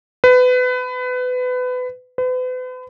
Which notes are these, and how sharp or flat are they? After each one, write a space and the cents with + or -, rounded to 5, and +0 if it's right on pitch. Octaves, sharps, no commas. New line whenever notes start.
B4 +25
B4 +40